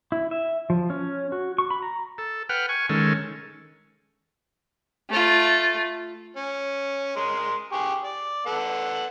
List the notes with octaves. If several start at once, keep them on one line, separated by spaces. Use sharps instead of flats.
E4
E5
F3
C#4
F#4
C#6
B5
A#5
A4
B4 F#5 G5 F6
G#5 C#6
D#3 G#3 C#4 A4
A3 F4
C#4
G#3 A#4 C6
G4 G#4 C#6
D5
B3 A4 F#5